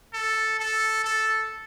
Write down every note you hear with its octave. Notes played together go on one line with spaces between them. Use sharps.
A4
A4
A4